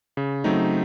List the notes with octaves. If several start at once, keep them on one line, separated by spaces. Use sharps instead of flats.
C#3
F#3 A3 C4 D#4